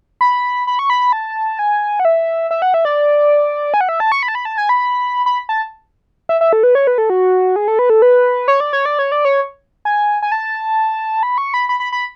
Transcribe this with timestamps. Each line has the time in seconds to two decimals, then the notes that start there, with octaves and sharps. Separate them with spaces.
0.21 B5
0.67 B5
0.79 C#6
0.90 B5
1.12 A5
1.59 G#5
2.00 F#5
2.05 E5
2.51 E5
2.62 F#5
2.74 E5
2.85 D5
3.74 G#5
3.81 F#5
3.89 E5
4.00 A5
4.12 C#6
4.23 B5
4.28 A5
4.35 B5
4.45 A5
4.58 G#5
4.69 B5
5.26 B5
5.49 A5
6.29 E5
6.41 E5
6.53 A4
6.63 B4
6.75 C#5
6.87 B4
6.98 A4
7.10 F#4
7.56 G#4
7.68 A4
7.79 B4
7.90 A4
8.02 B4
8.48 C#5
8.60 D5
8.73 C#5
8.85 D5
8.99 C#5
9.12 D5
9.25 C#5
9.85 G#5
10.22 G#5
10.32 A5
11.23 B5
11.38 C#6
11.54 B5
11.69 B5
11.80 B5
11.92 B5